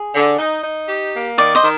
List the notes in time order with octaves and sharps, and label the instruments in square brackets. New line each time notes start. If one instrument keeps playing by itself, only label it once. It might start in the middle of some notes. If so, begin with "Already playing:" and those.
Already playing: [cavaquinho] G#4
[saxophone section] D3
D#4
D#4
G4
A#3
[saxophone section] D#3 [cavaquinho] D5
[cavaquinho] C5 D#5
[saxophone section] D#3